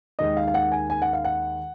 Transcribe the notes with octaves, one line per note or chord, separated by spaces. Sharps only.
D#2 D#3 G#3 D#5
F5
F5
F#5
G#5
G#5
F#5
F5
F#5